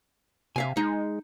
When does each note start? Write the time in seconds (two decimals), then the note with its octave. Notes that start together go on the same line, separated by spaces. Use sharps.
0.56 C3 E5 F5 G#5
0.77 G#3 D#4